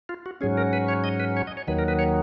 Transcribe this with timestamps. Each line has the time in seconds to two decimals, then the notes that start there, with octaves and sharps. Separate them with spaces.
0.09 F4
0.26 F#4
0.41 G#2 F#3 C#4 G#4
0.57 A#4
0.73 B4
0.88 C#5
1.04 D#5
1.20 B4
1.37 C#5
1.47 D#5
1.57 C#5
1.67 D#2 D#3 F#3 B4
1.78 A#4
1.88 B4
1.99 C#5